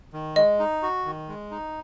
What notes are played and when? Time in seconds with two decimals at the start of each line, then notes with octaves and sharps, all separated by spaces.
0.13 D#3
0.36 G#3 D#5
0.59 D#4
0.83 F#4
1.05 D#3
1.29 G#3
1.51 D#4